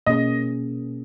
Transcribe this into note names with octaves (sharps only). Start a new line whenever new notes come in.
B2 A#3 C#4 G#4 D#5